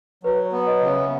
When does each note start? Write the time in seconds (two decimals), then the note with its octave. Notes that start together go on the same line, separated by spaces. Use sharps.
0.23 F#3 B4
0.46 C#5
0.52 B3
0.67 B4 D#5
0.80 C#3
0.87 C#5 E5
1.03 E5